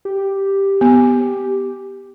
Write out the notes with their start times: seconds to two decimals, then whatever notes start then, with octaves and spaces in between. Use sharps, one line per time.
0.05 G4
0.81 B3